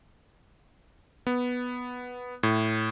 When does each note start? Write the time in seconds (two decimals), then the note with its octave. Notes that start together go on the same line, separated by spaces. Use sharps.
1.27 B3
2.43 A2